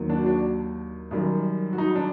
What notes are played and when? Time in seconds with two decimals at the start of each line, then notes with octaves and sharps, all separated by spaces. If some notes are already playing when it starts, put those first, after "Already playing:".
Already playing: D#2 D#3 F#3
0.09 D4 F#4
0.26 D4 F#4
1.11 F#2 D#3 G3
1.73 F#4
1.78 D#4
1.95 D4